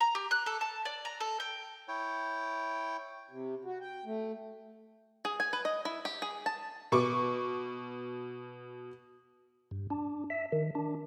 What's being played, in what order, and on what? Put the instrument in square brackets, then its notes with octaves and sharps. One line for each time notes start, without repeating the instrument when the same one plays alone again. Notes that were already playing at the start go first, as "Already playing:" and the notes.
[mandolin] A#5
G4
F#6
A4
A5
D5
A#5
A4
G5
[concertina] E4 C#5 G5
[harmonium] C3
F#4
G5
A3
[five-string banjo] G#4
G#5
B4
D#5
E4
G4
G#4
A5
[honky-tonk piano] B2 C#6 D6
[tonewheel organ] G2
D4
E5
D#3
D4